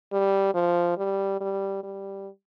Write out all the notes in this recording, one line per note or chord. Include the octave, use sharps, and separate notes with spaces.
G3
F3
G3
G3
G3